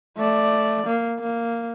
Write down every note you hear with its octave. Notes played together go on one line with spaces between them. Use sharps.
A3 D5
A#3
A#3